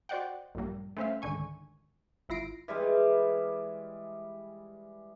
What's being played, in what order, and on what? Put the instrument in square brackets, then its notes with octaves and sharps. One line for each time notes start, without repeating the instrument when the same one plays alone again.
[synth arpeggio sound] F#4 C5 D5 D#5 F#5 G5
A#1 G2 A#2 G3 A#3
A3 C4 C#4 C5 E5 F5
C#2 G#2 D3 D#3 G#5 C#6
G#1 E4 F4 A#6 C7 D7
[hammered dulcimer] E3 G3 G#3